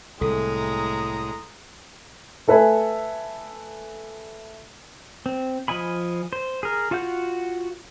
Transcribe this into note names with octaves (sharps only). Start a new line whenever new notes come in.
C2 A2 G#3 A4 A#5 D#6
A3 A4 B4 E5 G#5
C4
F3 D#5 G#5 B5
C5
G#4 A#4
F4 F#4 F5 F#5 G6